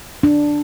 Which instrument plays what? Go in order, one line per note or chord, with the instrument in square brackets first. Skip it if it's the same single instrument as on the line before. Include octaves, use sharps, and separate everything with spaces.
[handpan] D4